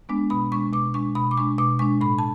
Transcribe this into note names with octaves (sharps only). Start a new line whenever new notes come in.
G#3 B3 D4
B2 B5
G#3 D4 C#6
B2 D6
G#3 D4 C#6
B2 B5
D6
G#3 D4 C#6
B2 D6
G#3 D4 C#6
A2 B5
A5